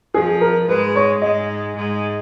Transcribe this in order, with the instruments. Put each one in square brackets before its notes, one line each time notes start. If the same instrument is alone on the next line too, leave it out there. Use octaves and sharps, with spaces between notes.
[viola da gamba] F2 F3 [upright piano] G#4
[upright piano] A#4
[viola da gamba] G#2 G#3 [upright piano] B4
[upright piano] C#5
[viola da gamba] G#2 G#3 [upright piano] D#5
[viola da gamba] G#2 G#3